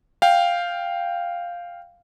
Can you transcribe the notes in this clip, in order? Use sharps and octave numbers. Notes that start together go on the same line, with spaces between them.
F5 G5